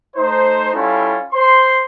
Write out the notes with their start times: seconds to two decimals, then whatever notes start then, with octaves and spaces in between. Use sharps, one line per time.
0.16 A3 D#4 C5
0.73 G3 C#4 E4 F4 A4
1.32 C5 C6